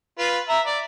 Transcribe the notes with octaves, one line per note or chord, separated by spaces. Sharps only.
F4 B4
E5 A#5
D5